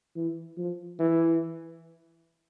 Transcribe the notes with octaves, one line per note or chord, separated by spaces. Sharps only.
E3
F3
E3